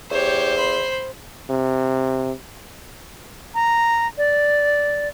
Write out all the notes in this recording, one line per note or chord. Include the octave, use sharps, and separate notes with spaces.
E2 G4 C5 C#5
B5 C6
C3
A#5
D5